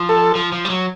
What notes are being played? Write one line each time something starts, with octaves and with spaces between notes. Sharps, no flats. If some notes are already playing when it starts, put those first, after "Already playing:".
Already playing: F3
A4
F3
F3
G3
F#3